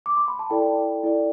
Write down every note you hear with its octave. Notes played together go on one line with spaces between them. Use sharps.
D6
C6
B5
A5
E4 A4 D5 G5
E4 A4 D5